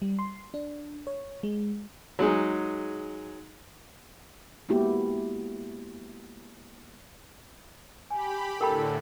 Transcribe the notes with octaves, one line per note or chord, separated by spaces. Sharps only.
G3
C6
D4
C#5
G#3
F#3 G#3 D#4 G#4
G#3 A#3 B3 E4 F#4 G4
G4 G#5 B5
A2 D3 A4 A#4 G5 B5